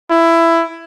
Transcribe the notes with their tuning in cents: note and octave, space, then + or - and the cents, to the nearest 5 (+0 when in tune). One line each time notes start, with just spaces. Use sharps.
E4 +15